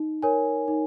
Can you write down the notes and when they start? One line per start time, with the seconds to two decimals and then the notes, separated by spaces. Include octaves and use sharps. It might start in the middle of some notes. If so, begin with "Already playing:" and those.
Already playing: D#4
0.23 A#4 C#5 G#5
0.68 D#4